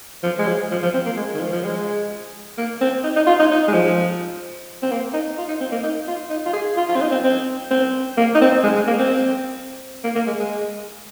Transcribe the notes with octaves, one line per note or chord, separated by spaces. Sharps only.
F3
G#3
F3
F3
F3
C4
A#3
G#3
D#3
F3
F3
G#3
A#3
C4
D#4
D#4
F4
D#4
D#4
G#3
F3
C4
A#3
D#4
F4
D#4
C4
A#3
D#4
F4
D#4
F4
G#4
F4
F4
C4
D#4
C4
C4
C4
A#3
D#4
C4
G#3
G#3
A#3
C4
A#3
A#3
G#3
G#3